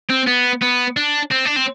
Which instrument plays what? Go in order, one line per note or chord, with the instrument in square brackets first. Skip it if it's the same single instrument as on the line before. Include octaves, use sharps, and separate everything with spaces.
[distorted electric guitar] C4
B3
B3
D4
C4
D4
C4